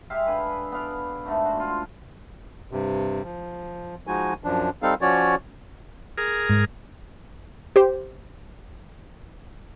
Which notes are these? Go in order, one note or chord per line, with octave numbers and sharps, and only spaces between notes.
G#3 G4 E5 F5
D3 G#4 B4
B3 D5 F5
G#2 D3 A3
F#4 C5
F4 C5
G2 C3
F3
F3 G#3 D#4 F#4 G#5
F#2 F3 D4
G3 C4 D#4 A4 F5
F3 C#4 F#4 C#5 D5
G#4 A#4
G#2
G4 C5